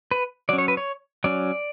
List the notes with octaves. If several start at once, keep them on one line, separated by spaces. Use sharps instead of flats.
B4
F#3 C#4 D5
C#5
B4
C#5
F#3 C#4 D5